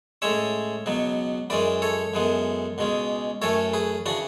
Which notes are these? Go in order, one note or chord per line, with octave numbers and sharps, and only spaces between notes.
A2 G#3 C#4 C#5 E5
C#2 B2 F#3 B3
F#2 E3 G#3 C#4 B4 D5
A4 C#5
F#2 E3 G#3 B3
C#2 B2 G#3 C#4
F#2 E3 A3 C#4 A4 C#5
G#4 B4
C#3 E3 D4 F#4